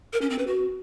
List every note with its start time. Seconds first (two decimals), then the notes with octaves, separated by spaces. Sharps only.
0.13 A#4
0.22 C#4
0.30 C4
0.39 B4
0.47 F#4